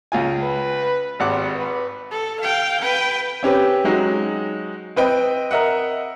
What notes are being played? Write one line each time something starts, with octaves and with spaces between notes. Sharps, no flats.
C#2 F4 G#5
B4
G#1 G3 F#5 D6
B4
A4
F5 G5
B4 G5
C4 C#4 G4 B4
F#3 G#3 D#4 F#4
C4 B4 D#5 G5
A#4 D#5 E5 F#5